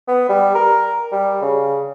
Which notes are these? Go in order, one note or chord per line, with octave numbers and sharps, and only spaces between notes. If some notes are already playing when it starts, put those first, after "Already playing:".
B3
G3
A#4
G3
C#3